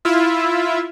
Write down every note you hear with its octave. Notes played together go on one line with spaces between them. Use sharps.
E4 F4 E5